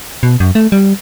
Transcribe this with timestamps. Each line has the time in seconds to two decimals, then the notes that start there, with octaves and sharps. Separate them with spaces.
0.23 B2
0.40 F#2
0.55 A3
0.72 G3